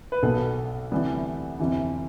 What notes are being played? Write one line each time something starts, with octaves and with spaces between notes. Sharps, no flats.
B4
B1 B2 B3 A4
D2 C3 E3 G3 B3
G1 F2 C3 E3